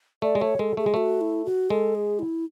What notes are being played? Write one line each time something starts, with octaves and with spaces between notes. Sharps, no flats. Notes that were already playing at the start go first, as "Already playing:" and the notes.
A3 D5
G#3
A3 C#5
G#3 A4
A3 G#4
G#3
A3 F#4
E4
F#4
G#3 A4
G#4
E4